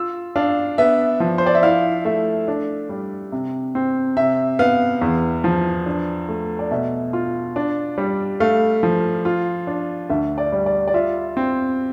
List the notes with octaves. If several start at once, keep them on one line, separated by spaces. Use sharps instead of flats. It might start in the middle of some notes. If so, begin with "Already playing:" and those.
Already playing: F4 E6
D4 F5
B3 E5
F3
C5
D5
E5
E4 F5
A3 E5
D4
G3
C3
C4
C3 E5
B3 F5
E2
F3
D4
A3
D5
B2 E5
F4
D4
G3
A3 F5
F3
F4
D4
D2 E5
D5
G3
D5
D5
F4 E5
C4